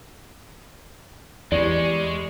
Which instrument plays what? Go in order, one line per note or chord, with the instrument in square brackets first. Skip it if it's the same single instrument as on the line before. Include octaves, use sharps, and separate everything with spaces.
[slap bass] E2 [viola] G3 C#6 [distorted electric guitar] G#3 [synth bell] D5